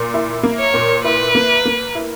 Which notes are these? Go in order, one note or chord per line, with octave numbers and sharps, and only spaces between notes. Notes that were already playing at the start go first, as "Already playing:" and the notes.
Already playing: A#2
E4
A#3
C#5
A#2
E4 B4
A#3
A#3
E4